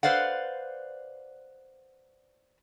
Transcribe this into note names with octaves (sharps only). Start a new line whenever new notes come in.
B4 C5 D5 F5 F#5